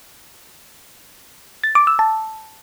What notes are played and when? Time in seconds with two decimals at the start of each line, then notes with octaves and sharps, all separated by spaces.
1.64 A6
1.75 D6
1.87 E6
1.99 A5